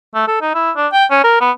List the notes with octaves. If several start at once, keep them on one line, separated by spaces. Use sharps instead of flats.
A3
A4
D#4
E4
D4
G5
C#4
A#4
B3